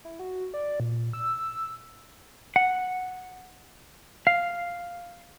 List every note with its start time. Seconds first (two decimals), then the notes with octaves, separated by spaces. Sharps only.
0.05 E4
0.19 F#4
0.54 D5
0.80 A#2
1.13 E6
2.56 F#5
4.27 F5